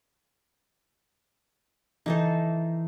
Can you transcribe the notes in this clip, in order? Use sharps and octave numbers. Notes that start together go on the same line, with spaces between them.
E3 D#4 A4 C5